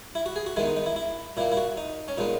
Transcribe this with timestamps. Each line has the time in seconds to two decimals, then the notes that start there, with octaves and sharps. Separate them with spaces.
0.15 E4
0.26 F#4
0.36 G#4
0.46 F#4
0.56 D#3 G#3 B3 E4
0.66 D#4
0.77 D#4
0.86 E4
0.96 E4
1.37 A#2 A#3 E4
1.52 E4
1.57 F#4
1.77 D#4
2.08 C#4
2.18 A#2 G#3 B3 D#4